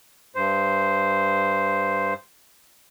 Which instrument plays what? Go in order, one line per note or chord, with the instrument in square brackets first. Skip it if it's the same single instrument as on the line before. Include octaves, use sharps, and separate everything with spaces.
[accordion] G2 C5